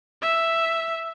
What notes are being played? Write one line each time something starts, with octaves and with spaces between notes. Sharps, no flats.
E5